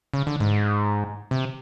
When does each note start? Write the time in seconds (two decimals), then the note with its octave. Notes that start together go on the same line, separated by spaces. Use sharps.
0.14 C#3
0.27 D3
0.40 G#2
1.31 C3